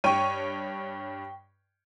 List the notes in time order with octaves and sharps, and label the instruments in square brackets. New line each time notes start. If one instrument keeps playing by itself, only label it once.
[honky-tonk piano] G2 C#5 D#7 [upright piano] G5 C#6